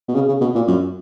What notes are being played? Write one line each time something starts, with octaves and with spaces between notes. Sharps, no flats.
B2
C#3
C#3
B2
A#2
F#2